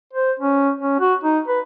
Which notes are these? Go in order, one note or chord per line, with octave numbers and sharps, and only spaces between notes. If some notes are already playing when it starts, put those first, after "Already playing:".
C5
C#4
C#4
F#4
D#4
B4